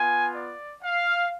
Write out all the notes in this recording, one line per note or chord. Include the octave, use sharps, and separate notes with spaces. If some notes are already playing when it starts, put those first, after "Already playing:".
Already playing: B3 F4 G#5
D5
F5